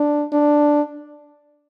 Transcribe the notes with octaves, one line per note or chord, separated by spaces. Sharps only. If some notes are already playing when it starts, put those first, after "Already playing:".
Already playing: D4
D4